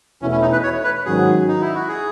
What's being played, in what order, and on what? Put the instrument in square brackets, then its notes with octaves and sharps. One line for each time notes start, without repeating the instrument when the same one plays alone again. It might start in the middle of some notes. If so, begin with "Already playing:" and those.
[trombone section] E2 B2 A3 E4 [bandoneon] C#4
[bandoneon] C#4
D#4
B4
C#5
B4
[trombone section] G#2 D#3 F#3 C#4 F#4 [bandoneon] G#4
[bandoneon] D#4
E4
F#4
G#4